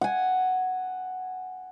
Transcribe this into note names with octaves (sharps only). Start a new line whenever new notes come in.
F#5 G#5